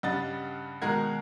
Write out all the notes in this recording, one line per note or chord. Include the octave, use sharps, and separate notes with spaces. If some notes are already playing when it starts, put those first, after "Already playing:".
G2 C#3 G3 D#5 F#5 A6
B2 D#3 G#3 A#4 F#5 G#6